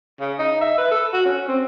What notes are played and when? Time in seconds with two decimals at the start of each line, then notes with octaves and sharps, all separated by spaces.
0.20 C#3
0.39 D#4
0.61 E5
0.78 B4
0.91 A4
1.13 F#4
1.25 C#4
1.48 C4